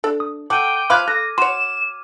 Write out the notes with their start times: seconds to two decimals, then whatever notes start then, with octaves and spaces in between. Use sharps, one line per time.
0.04 D4 A4
0.20 D#6
0.50 A4 F#5 G5 D6 D#7
0.90 F3 F5 B5 C6 D6 F6 F#6 G#6
1.08 A4 F#6 A#6
1.38 F#4 C#5 C6 E7